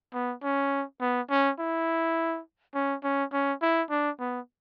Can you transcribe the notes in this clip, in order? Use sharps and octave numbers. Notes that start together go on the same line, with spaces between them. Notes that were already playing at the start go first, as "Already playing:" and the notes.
B3
C#4
B3
C#4
E4
C#4
C#4
C#4
E4
D4
B3